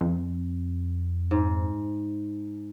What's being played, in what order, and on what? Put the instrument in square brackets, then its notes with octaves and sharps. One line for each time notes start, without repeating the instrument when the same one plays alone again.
[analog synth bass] F2
[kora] G#2